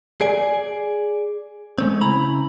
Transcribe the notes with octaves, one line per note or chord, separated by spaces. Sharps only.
G#4 D5 G#5
G#3 A3 C4
C#3 E4 A#5 B5